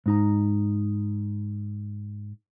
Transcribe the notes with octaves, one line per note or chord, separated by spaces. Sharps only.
G#2 D#4 A#5